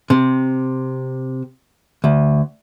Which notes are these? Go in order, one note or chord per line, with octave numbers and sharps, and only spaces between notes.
C3
D2